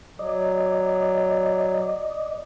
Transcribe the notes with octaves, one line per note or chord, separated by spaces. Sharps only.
F#3 D5 D#5